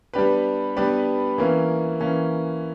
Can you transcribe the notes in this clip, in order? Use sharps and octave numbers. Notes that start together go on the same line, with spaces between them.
G3 B3 D4 G4 B4
G3 B3 D4 G4 B4
E3 A#3 C#4
E3 A#3 C#4